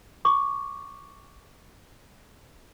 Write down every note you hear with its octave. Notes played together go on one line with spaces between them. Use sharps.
C#6 D6